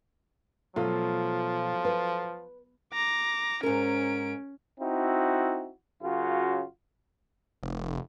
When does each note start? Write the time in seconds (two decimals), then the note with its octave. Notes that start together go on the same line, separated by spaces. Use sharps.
0.76 B2 F3 F#3 A3 F4
1.85 B4
2.94 A#5 D6
3.63 G#2 C#4 A#4 D7
4.80 C4 D#4 E4 F#4
6.02 F#2 C#3 F4 F#4
7.63 F1